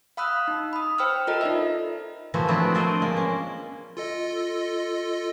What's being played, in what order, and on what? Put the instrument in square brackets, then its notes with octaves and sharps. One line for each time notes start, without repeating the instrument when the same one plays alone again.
[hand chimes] F5 B5 D#6 E6 F#6
D#4
B5 D#6
C5 G5 B5 E6 F6
F4 A4 A#4 D#5 A#5
D#4 F4 D5 E5
[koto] E3 F3 A3 A#3 E4 F#4
F3 F#3 A3 B3 C4 D4
D4 F4 A#4 C5 D5 D#5
G#3 A#3
C#4
[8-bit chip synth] F4 A4 D#5